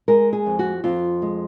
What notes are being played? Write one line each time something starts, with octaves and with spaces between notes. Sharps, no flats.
G#3 A#4
G#4
F2
F#4
F2 F4
G#3